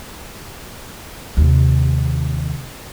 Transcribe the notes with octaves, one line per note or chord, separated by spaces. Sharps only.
D#2 C3